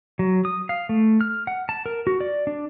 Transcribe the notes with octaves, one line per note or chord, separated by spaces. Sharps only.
F#3
D#6
F5
A3
F6
F#5
A5
A#4
F#4
D5
D4